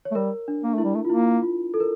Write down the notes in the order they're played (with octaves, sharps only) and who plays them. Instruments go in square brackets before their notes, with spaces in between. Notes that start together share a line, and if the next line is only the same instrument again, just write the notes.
[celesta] C#5
[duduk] A3
[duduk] G3 [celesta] A#4
[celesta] D4
[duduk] A#3
[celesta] D4
[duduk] A3 [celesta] E4
[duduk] G3
A3
[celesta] F4
[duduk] A#3 [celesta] E4
[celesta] F4
A4
A#4